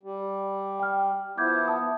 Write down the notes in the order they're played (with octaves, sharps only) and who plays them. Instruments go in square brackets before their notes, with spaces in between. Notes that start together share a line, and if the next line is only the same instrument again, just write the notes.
[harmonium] G3
[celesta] G5 F6
[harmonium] F3 B3 E4 [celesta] D6 G6 G#6
[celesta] E5 A5 D#6